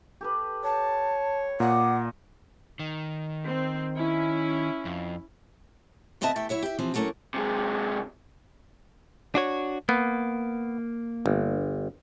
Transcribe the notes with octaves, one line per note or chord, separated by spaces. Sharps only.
G4 A4 B4
C#5 A5
A#2 D5 D#5 F#5 A#5
D#3
C4
C#4 E4
F2
D2 B3 C4 D#5 E5 A5
E2 A3 G4 E5
F#3 E4 C#5 E5
G4 E5
E3 F3 C4
F#3 G3 A3 A#3 C#4
C3 G#3
D4 F#4 C#5
A#3 B3
G1